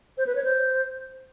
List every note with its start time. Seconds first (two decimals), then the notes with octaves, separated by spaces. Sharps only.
0.18 C5
0.27 B4
0.35 C#5
0.44 C5